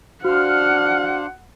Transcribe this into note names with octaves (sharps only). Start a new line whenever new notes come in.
D4 F#4 C5 F5 F#5 F6